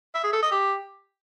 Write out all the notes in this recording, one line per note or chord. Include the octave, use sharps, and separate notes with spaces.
E5
G#4
A4
D#5
G4